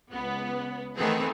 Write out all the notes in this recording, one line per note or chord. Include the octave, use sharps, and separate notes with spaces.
C#2 B3
D#3 E3 A3 B3 C4 G#4